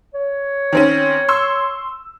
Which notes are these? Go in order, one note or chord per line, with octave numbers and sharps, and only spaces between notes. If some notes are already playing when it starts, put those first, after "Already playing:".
C#5
D#3 C4 C#4
C6 C#6 E6